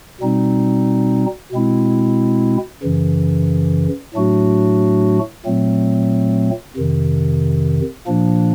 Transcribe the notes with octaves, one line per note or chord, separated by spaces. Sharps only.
B2 G3 C4 D#4
B2 G#3 C4 E4
F#2 C#3 E3
A2 F#3 A3 D4 F#4
A#2 F#3 A3 C4
F2 C3 D#3
A#2 F3 A#3 D4